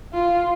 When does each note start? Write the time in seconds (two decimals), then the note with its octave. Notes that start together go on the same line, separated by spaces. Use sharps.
0.13 F4